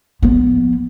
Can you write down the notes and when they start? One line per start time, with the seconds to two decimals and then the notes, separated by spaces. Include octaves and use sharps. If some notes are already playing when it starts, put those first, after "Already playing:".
0.23 F3 B3